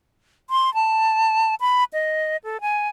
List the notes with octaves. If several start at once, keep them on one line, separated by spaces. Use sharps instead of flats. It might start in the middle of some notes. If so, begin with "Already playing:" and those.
C6
A5
B5
D#5
A4
G#5